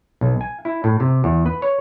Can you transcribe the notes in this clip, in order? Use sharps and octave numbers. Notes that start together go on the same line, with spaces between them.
B1
G#5
E4
A2
C3
E2
B4
C#5